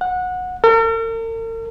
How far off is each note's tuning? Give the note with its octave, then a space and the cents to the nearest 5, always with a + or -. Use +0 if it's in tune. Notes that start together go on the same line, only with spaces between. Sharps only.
F#5 -20
A#4 -45